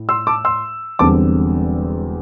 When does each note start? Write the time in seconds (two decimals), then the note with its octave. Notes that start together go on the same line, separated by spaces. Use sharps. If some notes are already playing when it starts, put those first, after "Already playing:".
Already playing: A2
0.09 C6 E6
0.27 A5 D6
0.45 C6 E6
0.99 E1 E2 D3 G3 C4 A5 D6